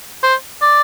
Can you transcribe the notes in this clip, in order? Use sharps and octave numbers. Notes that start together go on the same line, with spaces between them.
C5
D5